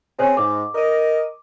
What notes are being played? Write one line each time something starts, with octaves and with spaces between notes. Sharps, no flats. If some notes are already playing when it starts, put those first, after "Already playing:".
C4 G#4 C5 C#5
G#2 D6
A#4 D#5